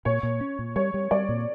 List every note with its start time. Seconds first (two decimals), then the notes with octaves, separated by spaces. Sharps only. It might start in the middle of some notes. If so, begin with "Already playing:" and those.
0.05 A#2 C#5
0.23 A#2
0.41 C#4
0.59 A#2
0.76 G3 C#5
0.94 G3
1.11 G3 D5
1.29 A#2